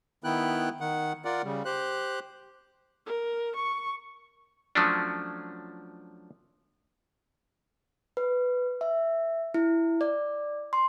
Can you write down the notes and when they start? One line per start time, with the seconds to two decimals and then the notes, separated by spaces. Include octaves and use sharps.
0.24 D#3 B3 E4 G5 F#6
0.81 D#3 F#5
1.25 F4 A#4 D5 F#5
1.44 C#3 G3
1.65 G4 C5 F#6
3.06 A#4
3.57 C#6
4.75 F3 F#3 A3 C#4 D4
8.17 B4
8.81 E5
9.54 E4
10.01 D5
10.73 C6